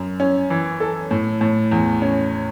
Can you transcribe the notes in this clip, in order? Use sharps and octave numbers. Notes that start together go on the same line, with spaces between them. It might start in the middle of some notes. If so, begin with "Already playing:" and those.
Already playing: F#2
C#4
E3
A4
A2
A2
E2
C#4